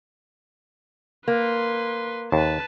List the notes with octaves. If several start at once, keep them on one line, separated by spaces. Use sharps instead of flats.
A#3 B4 C6
D#2 B4 A5